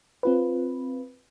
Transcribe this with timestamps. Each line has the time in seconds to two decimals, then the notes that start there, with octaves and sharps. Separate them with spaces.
0.23 C4 F4 B4